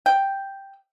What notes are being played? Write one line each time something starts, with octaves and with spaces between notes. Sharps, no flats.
G5